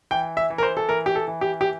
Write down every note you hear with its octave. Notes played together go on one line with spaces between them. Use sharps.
E3 G5
E5
E3
A#4
C5
A4
E3 A#4
G4
A4
E3
G4
G4